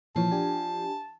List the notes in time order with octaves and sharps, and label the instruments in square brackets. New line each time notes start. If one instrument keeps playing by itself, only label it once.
[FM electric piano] A#2 E3 C#5 [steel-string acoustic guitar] F3 [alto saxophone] A5
[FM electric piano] D4 G4 G#5